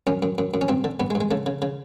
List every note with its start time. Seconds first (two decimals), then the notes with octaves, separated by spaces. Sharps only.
0.07 F#2 C#4
0.22 F#2
0.38 F#2
0.54 F#2
0.61 C#4
0.68 G2 C4
0.84 D3
1.00 G2 B3
1.10 G#3
1.15 G2
1.21 G#3
1.31 C#3 A3
1.46 C#3
1.62 C#3